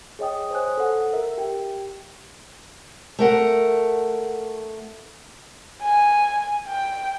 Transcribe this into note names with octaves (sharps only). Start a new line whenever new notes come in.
G#4 C#5 D#5 G5 D#6
C5 C#5 G#5 D#6 F#6
A4 F#5
A#4 E5
G4 G5
A3 A#4 F#5
G#5
G5